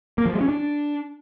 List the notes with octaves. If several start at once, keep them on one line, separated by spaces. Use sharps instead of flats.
A#3
F3
G#3
C#4
D4